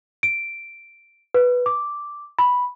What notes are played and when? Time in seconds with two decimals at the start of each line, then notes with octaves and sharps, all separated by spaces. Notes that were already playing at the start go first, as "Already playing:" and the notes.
0.23 D7
1.34 B4
1.66 D6
2.39 B5